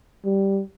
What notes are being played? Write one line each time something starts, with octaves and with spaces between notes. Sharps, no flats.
G3